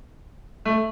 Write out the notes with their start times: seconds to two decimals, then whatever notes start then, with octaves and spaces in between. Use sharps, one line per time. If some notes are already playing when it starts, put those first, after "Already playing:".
0.65 A3